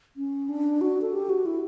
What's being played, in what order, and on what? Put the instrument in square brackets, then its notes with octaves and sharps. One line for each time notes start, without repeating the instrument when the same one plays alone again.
[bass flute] C#4
D4
F#4
A4
G4
F#4
E4